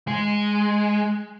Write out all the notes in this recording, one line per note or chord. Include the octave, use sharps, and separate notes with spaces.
G#3